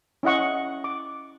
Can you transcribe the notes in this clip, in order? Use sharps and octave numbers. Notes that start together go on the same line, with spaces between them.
C#4 E4 D#5 F#5 C#6
D6